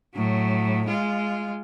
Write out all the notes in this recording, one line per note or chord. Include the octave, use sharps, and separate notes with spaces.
A2 F#3
G#3 F4